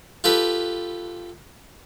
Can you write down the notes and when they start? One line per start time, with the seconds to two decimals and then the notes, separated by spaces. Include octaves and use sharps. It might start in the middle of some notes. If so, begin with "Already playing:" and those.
0.24 F4 G4 A4 B4